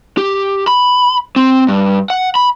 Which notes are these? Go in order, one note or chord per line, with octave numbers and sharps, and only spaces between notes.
G4
B5
C4
G2
F#5
B5